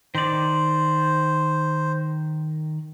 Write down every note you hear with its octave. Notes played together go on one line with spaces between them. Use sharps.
D#3 C5 D5